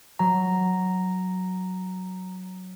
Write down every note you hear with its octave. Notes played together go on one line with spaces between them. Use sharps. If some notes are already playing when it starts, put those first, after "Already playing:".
F#3 A#5